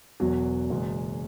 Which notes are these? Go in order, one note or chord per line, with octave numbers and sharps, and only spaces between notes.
E1 E2 B2 F#3
F#1 E2 B2 G#3